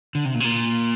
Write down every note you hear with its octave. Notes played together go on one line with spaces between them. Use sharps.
D3
C3
A#2
C3
A#2